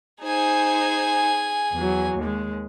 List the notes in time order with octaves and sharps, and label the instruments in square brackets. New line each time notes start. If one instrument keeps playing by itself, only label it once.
[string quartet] D#4 C5 G#6 [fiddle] G#4 G#5
[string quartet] E2 F#3
D#2 G#3